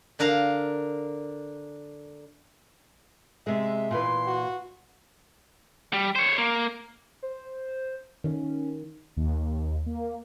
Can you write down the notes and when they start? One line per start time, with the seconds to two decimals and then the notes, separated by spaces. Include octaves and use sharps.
0.19 D3 D4 A#4 F5 A#5
3.47 C3 G#3 E5
3.91 A#2 E3 B4 C6
4.27 F#4
5.93 G3
6.16 C5 C#5
6.38 A#3
7.23 C5
8.24 D#3 C#4
9.17 D#2
9.86 A#3